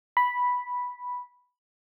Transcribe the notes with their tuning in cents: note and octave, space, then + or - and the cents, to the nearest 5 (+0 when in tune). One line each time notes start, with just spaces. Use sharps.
B5 -5